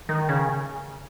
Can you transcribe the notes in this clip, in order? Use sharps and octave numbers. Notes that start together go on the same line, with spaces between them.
D#3
C#3